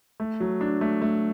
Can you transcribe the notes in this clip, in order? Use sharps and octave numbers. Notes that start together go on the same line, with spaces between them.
A3
F#3
D4
A3
A3